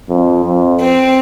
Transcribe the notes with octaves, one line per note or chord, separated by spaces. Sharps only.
F2
F2
C4